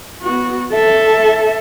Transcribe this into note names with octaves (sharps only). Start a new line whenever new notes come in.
B3 F#4
A4 E5